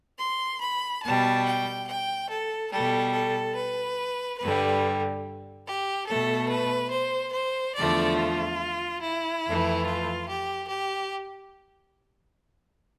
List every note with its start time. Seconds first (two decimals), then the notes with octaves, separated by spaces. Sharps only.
0.20 C6
0.63 B5
1.04 B2 G3 A5
1.46 G5
1.89 G5
2.31 A4
2.72 B2 G3 A4
3.14 A4
3.57 B4
4.41 G2 D3 G3 B4
5.67 G4
6.09 B2 A3 A4
6.51 B4
6.92 C5
7.35 C5
7.78 E2 D3 F3 A3 D5
8.19 F4
9.04 E4
9.45 F2 E3 A3
9.87 F4
10.30 G4
10.71 G4